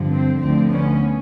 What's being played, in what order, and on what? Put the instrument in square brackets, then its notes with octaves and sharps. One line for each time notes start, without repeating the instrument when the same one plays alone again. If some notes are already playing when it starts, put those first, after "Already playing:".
Already playing: [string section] G2 D3 F3
C4
D2 D3 F3 C4
B3 C#4